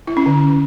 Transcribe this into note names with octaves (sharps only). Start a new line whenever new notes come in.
E4
C#4
D3